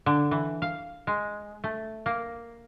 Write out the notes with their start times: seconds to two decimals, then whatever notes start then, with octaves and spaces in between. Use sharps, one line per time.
0.06 D3
0.31 E3
0.62 F5
1.07 G#3
1.64 A3
2.06 A#3